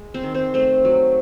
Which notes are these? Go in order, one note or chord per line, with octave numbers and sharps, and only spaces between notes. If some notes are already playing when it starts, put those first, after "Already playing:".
Already playing: G#3
C4 C5
D#3
C4 C5
A3 C4 C5
F#3